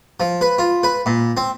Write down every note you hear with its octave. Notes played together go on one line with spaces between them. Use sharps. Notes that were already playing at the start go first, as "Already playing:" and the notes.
F3
B4
F4
B4
A#2
C4